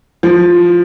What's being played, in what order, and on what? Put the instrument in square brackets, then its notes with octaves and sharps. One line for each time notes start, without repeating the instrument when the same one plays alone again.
[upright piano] F3